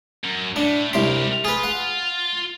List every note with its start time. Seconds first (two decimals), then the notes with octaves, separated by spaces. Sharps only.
0.24 F#2
0.56 A2 A3 D4
0.93 C2 C3 G4 A#4 C6
1.45 F4 G#4 B4
1.63 F#5